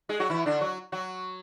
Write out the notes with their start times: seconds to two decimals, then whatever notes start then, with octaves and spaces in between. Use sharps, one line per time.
0.09 G#3 G#4
0.20 F#3 F#4
0.30 E3 E4
0.46 D3 D4
0.61 F#3 F#4
0.92 F#3 F#4